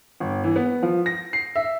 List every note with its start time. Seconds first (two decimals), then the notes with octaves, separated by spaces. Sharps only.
0.20 G1
0.44 E3
0.56 B3
0.83 F3
1.06 A#6
1.33 C7
1.56 E5